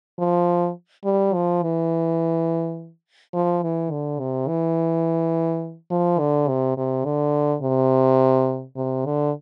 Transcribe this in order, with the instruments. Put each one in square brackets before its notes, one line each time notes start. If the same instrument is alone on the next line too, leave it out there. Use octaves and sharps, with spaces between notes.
[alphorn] F3
G3
F3
E3
F3
E3
D3
C3
E3
F3
D3
C3
C3
D3
C3
C3
D3